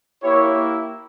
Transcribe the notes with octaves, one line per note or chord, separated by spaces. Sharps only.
A#3 E4 G4 C#5